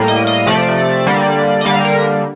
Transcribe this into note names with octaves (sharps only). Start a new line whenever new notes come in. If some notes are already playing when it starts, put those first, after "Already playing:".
Already playing: A2 G3 A#3
D#5
D#5
C3 F3 A3 D5
D3 G3 A#3
D#5
D3 G3 A#3 F5
A#4